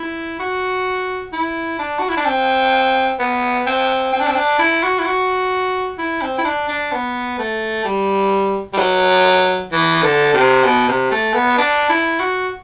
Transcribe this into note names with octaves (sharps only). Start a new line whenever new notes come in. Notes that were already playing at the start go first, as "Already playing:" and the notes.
Already playing: E4
F#4
E4
D4
F#4
E4
D4
C4
B3
C4
C4
D4
C4
D4
E4
F#4
E4
F#4
E4
C4
E4
D4
D4
B3
A3
G3
G3
F#3
E3
D3
C3
B2
C3
A3
B3
D4
E4
F#4